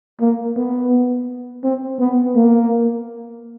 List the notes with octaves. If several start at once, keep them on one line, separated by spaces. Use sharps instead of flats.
A#3
B3
C4
B3
A#3